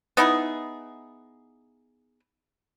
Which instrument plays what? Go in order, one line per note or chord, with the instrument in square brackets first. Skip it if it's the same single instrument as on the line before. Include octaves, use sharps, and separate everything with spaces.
[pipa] B3 D#4 E4 G#4